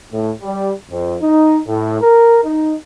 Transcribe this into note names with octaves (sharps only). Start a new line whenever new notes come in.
A2
G3
F2
D#4
A2
A#4
D#4